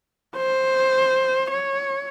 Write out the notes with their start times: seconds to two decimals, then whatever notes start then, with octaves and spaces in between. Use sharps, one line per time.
0.36 C5
1.51 C#5